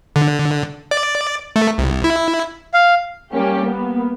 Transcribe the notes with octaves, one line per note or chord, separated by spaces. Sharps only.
D3
D5
A3
C2
E4
F5
G3 A#3 C#4 G4
A#3 B3